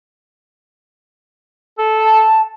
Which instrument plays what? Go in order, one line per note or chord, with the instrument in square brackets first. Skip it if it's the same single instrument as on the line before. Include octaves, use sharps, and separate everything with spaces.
[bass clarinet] A4
[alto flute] A5